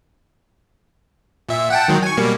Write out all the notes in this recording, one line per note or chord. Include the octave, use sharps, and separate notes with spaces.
A#2 E5
F#5 G5 A5
D#3 F#3 G#3
G#5 C#6
B2 G3 A#3